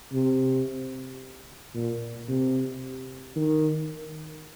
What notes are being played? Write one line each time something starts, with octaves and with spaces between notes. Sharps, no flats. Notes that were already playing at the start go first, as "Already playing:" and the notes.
C3
A#2
C3
D#3